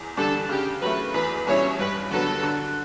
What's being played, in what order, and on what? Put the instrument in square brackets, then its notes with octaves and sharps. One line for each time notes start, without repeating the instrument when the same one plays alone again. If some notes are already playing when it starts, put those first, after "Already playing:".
Already playing: [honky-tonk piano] E2
[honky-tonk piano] D3 G3 D4 [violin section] A4
[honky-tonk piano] C#3 [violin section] G4
[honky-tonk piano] F#3 A3 [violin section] B4
[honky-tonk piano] E2 [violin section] B4
[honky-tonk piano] B2 G3 C#4 E4 [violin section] C#5
[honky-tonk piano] G2 [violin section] B4
[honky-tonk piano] D3 F#3 B3 [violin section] A4
[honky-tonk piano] D3